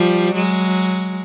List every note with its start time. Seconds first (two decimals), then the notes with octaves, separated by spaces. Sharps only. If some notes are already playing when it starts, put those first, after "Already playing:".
Already playing: F3 G3
0.34 F#3 G#3